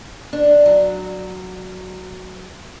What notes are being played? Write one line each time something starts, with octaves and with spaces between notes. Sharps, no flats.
D4
F#3